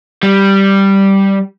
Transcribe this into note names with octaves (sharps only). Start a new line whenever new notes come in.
G3